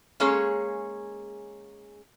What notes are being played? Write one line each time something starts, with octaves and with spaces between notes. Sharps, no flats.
G#3 A#3 C#4 G#4 C#5